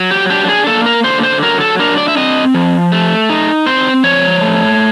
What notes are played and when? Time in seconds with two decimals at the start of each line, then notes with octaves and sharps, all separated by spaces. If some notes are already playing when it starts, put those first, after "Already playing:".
Already playing: F#3
0.11 G4
0.30 D4 G4
0.49 G#4
0.67 A#3 A4
0.86 A#4
1.04 D3 C5
1.23 C5
1.42 F#3 A#4
1.61 A4
1.79 D4 A#4
1.98 D5
2.08 E5
2.17 C4 D#5
2.54 F3
2.92 A3
3.30 D#4
3.66 C4 C5
4.04 F3 C#5
4.41 A3